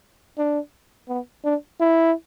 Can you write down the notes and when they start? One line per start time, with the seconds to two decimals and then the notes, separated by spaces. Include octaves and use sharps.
0.38 D4
1.08 B3
1.44 D4
1.80 E4